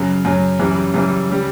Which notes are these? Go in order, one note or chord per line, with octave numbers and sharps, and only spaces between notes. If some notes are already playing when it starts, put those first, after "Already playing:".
Already playing: F#2 C#3 F#3
F#2 C#3 F#3
F#2 C#3 E3 G3
F#2 C#3 E3 G3
C#3 G3